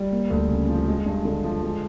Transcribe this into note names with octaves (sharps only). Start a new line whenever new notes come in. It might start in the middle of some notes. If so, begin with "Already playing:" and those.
Already playing: G3
A#3
D2
C#3
F3
G#3
G2
D3
F3
G#3